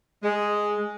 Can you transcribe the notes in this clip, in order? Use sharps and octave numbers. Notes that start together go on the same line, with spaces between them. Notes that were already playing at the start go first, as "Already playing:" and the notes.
G#3